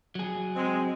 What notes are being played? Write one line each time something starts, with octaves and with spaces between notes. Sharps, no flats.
F#3 G#4
G#3 C4